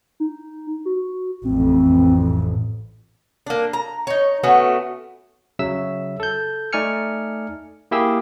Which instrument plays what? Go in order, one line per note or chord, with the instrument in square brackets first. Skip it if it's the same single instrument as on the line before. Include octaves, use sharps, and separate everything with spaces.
[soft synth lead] D#4
F#4
[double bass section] A1 F2 [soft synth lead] C4
[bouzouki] A#3 D4
A#5
D#4 C#5
A3 B3 C#4 F#4
[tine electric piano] C#3 F#3 E5 E6
A4 G6
A3 D#4 D5 G#5 F6 C#7
A#3 E4 G4 G#4 E6